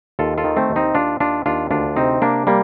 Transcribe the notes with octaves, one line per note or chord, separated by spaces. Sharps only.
D#2 F4 A4
F4 A4
D#3
A3 C4
D#2
C4 D#4
D#2 D4 F4
D#2 D4 F4
D#2 D4 F4
D2 D4 F4
C3 C4 D#4
C3 A#3 D4
G3 A#3